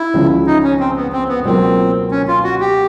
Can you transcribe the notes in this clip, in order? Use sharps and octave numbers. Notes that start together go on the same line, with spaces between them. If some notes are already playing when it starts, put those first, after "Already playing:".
Already playing: E4
C#2 C#3 F3
D#4
C#4
C4
B3
C4
B3
C#2 B2 F#3 A#3 C4
C#4
F4
F#4
G4